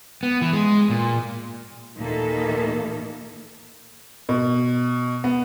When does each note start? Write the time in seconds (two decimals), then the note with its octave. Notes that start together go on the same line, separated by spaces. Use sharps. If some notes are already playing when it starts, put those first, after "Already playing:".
0.23 B3
0.42 E3
0.53 G#3
0.90 A#2
1.98 D#2 A#2 E3 A#3 D#4 A4
4.29 B2
5.24 B3